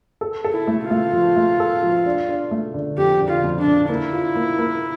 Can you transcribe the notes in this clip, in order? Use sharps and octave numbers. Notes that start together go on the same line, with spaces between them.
A4
A4
E4
A3
F4
A3
F3
A3
A4
F3
D4
D4
A3
D3
F2 G4
D3
F4
F2
D4
D3
A#3 E4
F4
A#3
A#3